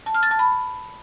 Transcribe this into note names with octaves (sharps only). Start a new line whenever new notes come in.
A5
F6
A6
A5
B5